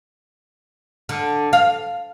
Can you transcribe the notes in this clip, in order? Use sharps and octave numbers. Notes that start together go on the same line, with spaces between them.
D3
F5